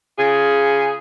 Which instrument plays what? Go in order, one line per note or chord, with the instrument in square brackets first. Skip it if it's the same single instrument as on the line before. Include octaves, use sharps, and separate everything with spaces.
[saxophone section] C#3 F4 G#4